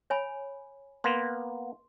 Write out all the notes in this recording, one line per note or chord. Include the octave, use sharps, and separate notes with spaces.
C#5 G#5 B5
A#3 B3 C6